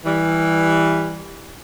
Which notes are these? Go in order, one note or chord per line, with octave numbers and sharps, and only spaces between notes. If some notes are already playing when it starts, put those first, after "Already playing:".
E3 G3